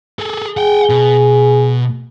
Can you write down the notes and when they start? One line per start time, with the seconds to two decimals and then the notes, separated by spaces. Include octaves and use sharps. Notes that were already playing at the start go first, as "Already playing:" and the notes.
0.19 G#4 A4
0.57 G#4 F#5 G5
0.89 B2